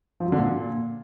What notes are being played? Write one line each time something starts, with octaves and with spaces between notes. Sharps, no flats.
F3
F#3
D3
A#2